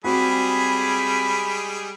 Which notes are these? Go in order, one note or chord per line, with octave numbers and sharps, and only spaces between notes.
G3 G#3 C4 F#4 G#4 B5